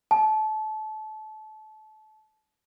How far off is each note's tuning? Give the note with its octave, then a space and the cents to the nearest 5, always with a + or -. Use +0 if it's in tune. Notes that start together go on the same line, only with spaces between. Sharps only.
A5 -25